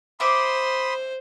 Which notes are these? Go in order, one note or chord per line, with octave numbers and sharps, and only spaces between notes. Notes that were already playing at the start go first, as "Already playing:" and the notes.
C5 E5 B5 C6 D6 D#6